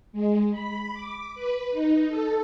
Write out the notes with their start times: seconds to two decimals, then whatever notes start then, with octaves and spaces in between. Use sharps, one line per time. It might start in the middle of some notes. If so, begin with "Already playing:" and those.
0.13 G#3
0.51 B5
0.94 D6
1.35 B4
1.71 D#4
2.08 A4